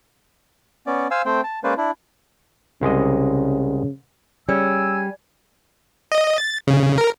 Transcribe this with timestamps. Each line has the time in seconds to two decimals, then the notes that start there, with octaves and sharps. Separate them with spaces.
0.87 B3 C#4 D5
1.11 C5 F5 G#5 E6
1.26 A3 C4 C5 G5
1.44 A5
1.64 G#3 A#3 C#4 B4 C5 D5
1.77 D4 E4
2.82 C2 C#3 G#3 D#5
4.49 G3 C#4 G#4 C#5 G#5 E6
6.12 D#5
6.38 A6
6.67 C#3
6.98 A#4